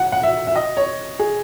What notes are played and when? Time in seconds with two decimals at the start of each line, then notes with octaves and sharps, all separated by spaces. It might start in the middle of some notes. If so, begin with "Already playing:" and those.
Already playing: F#5
0.12 F#5
0.23 E5
0.47 E5
0.56 D#5
0.77 C#5
1.19 G#4